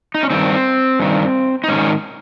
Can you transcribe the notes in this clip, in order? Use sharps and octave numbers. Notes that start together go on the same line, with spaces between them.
D#4
C#4
G2 D#3 C4
G2 D#3
D#4
G#2 D#3 C#4